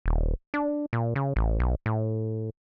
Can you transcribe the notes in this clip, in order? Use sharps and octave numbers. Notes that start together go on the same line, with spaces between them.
D#1
D4
A#2
C#3
A1
B1
A2